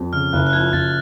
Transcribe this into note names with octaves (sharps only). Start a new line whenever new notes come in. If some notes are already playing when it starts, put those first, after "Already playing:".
Already playing: F2
C#3 F6
F#1 F#6
F#6
F3 G#6
F#1 A6